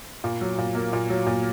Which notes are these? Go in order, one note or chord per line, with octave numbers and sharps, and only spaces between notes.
A#2
F#3
A#2
A#3
A#2
F#3
A#2